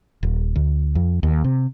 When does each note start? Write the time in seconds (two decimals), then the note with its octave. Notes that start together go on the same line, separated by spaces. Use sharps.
0.23 D#1
0.56 D2
0.95 F2
1.23 D#2
1.44 C3